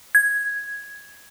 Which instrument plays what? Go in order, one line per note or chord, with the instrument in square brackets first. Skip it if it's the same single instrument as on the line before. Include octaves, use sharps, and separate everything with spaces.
[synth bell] G#6